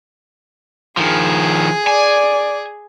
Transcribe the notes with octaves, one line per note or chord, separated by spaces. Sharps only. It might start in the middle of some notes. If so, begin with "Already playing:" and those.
D#3 F3 G#4
D5 G#5